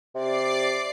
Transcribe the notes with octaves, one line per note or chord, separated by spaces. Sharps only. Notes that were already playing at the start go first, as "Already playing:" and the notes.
C3 D5 D6 C7